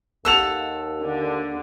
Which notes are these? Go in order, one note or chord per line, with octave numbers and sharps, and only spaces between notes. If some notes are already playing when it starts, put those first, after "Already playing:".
D#2 A4 F#5 E6 F7
D3